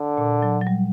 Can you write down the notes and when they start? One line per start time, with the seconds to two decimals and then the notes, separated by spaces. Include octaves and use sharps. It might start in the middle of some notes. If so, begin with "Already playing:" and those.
Already playing: D3
0.17 A#2
0.42 F#3
0.61 F#3
0.67 G3